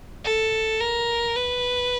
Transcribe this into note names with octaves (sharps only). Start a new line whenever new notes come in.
A4
A#4
B4